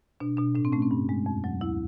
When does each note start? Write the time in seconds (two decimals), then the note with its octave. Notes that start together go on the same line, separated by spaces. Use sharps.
0.20 B2 D4
0.37 B2 D4
0.55 A2 D4
0.65 C4
0.72 A3 C#4
0.82 C4
0.91 G2
1.09 G#3
1.26 F2
1.44 F#3
1.61 D2 E4